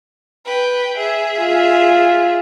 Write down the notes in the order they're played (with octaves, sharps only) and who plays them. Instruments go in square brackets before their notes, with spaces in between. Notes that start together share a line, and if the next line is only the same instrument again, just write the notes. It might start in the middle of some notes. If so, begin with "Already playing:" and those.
[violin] B4 G5
G#4 E5
[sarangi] F4